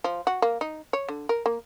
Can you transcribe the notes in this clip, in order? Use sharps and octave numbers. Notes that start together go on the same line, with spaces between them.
F3
F#4
A#3
D#4
C#5
D3
A#4
A#3